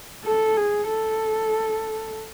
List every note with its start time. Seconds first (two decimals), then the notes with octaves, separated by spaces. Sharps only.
0.25 A4
0.57 G#4
0.88 A4